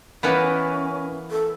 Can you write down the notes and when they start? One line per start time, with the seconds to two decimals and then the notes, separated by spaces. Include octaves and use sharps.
0.23 E3 A#3 B3 C#4 A#4 B4 B5
1.31 A4